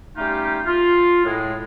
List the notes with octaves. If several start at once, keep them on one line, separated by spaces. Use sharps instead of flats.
G3 A3 C#4 D#4 F4 G4
F4
A2 G#3